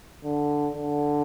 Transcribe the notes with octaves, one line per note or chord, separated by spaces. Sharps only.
D3
D3